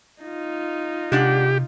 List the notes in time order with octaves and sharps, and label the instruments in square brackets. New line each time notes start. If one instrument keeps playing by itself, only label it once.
[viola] D#4 F4
[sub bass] C3 [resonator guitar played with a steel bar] G#3 D4 F#5 [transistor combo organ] G4